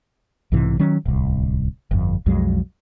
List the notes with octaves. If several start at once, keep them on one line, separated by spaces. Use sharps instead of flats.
B1 G#2 C3 E3
D#3 F#3 C#4
D1 C2
G1 F2
B1 F2 F#3 G#3